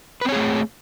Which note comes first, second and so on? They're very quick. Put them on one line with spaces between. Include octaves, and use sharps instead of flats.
B4 C4 C#5 G#4 A3